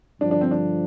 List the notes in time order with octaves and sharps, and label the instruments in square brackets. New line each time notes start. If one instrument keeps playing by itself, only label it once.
[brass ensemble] G2 D3 F3 [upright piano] D4
[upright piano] D4
C4
D4